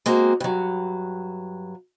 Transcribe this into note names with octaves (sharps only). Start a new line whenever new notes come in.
G#3 A#3 C4 F#4
G2 F#3